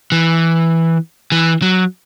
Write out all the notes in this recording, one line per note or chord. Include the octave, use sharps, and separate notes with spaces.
E3
E3
F#3